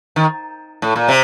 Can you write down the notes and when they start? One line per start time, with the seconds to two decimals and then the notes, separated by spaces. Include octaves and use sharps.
0.16 D#3
0.82 A2
0.96 A#2
1.08 C3